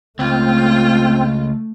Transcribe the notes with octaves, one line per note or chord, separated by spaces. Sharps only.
C#2 A3 C4 F4